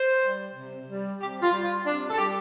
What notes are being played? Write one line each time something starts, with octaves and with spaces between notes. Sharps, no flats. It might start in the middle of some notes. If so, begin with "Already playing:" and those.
Already playing: C5
G3
C3
G3
C3 G4
F4
G3
F4
C3 D4
A4
G3 G4